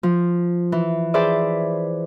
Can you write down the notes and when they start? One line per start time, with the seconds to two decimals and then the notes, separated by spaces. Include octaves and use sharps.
0.03 F3
0.72 E3
1.14 G#4 B4 C5 D5 E5 D6